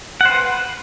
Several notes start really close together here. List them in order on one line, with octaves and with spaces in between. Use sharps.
F#5 C5 B4